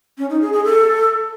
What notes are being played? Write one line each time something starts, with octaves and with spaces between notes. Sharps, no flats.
C#4
D#4
G#4
G#4
A4